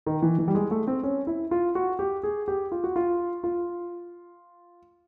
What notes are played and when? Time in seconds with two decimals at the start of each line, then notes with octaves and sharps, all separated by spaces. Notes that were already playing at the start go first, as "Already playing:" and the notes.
0.06 D#3
0.22 E3
0.38 E3
0.48 G3
0.55 G#3
0.71 A3
0.88 C4
1.03 C#4
1.27 E4
1.51 F4
1.75 F#4
1.99 G4
2.23 G#4
2.48 G4
2.72 F4
2.84 F#4
2.96 F4
3.44 F4